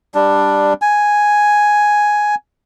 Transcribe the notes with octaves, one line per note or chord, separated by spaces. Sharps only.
G3 D4
G#5